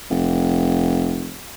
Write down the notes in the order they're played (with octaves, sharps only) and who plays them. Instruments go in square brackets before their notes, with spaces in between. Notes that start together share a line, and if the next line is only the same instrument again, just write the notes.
[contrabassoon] F1